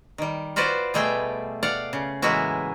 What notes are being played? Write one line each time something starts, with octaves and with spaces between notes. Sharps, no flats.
D#3 G3
F4 F#4 B4 C5 D5
B2 G3 A3 G#4 G5 G#5
D5 F5 F#5
C#3
A2 E3 G#3 A#3 E4 F#4